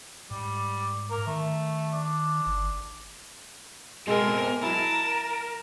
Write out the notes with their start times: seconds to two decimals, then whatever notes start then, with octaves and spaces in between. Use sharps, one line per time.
0.31 G#2 G3
1.10 A#4
1.27 D#3 A3
1.93 D4
2.46 G1
4.07 B2 G#3 C4 A4 A#4
4.62 F#3 E4 A#4 A5